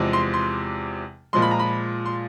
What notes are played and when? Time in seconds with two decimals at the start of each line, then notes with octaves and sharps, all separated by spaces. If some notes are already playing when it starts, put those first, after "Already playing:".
Already playing: E2 C3 F3 G#3
0.13 C6
0.34 C6
1.33 A#2 F3 G#3 C6
1.42 B5
1.51 A#5
1.59 B5
2.06 C6